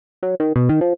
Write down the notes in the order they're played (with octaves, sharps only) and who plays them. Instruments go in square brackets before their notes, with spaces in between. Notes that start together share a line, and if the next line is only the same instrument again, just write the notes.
[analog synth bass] F#3
D#3
B2
D#3
F3